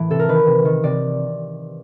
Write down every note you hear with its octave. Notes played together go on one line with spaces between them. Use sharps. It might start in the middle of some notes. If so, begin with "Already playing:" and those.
Already playing: A2 E3
C3 A4
A#4
D#3 B4
C3
D#3
C3 D5